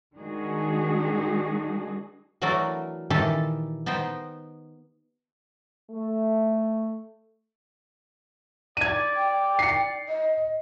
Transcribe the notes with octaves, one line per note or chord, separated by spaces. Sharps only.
D#3 G#3 D4 D#4 F#4 G#4
E3 F#3 A3 D4 F#4 A#4
A#2 D#3 E3 G4 A4 A5
B3 D#4 C5 G5
A3
D5 G#6 D#7
G5
C7 C#7
D#5